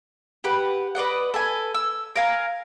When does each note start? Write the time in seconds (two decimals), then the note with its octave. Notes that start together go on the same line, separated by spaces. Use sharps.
0.44 G4 B4 F#5
0.95 B4 D5 D#5 F#5
1.34 A4 B4 G#5
1.74 E6
2.16 A#4 F5 G#5